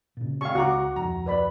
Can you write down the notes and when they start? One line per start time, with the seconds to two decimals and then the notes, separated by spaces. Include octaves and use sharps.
0.17 A#2 C#3
0.41 G#1 F5 C#6
0.55 C#2 F#4 F#5 A#5 D6
0.96 D1 F2 A#5
1.26 B4 D5 B5